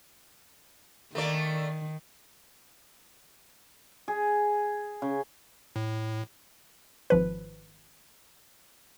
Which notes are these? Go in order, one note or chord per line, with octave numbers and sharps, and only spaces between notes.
D#3 A3 A#3 D5
G#4
C#3
A2
G#1 F3 B4